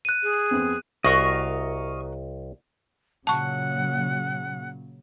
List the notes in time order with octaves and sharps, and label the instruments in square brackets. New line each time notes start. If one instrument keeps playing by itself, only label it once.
[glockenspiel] F#6 D#7
[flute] G#4
[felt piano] F2 B3 C4
[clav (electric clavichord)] C2 [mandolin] F#4 A#4 D#6 [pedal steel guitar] D#5 F5 C#6
[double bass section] A#2 C#3 F#3 [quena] F#5 [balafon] A5 C#6